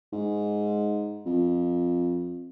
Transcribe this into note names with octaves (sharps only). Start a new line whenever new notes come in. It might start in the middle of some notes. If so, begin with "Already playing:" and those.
G#2
F2